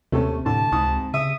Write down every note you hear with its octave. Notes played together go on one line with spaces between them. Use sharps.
D#2 C3 A3 C#4 A4
A2 D3 A5
C#2 G#2 D#6
C#3 E5 D#6